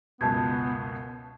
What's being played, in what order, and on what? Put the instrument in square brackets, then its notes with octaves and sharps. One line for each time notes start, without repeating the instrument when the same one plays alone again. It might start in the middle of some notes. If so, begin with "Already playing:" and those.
[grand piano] C#2 F#2 B2 [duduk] B3 [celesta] A5 G6 G#6